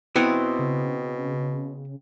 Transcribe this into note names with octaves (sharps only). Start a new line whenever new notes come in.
B2 B3 C4 E4 F#5
C#3